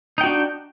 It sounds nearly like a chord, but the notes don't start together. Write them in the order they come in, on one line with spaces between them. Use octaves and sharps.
D#4 G5 F#4 D4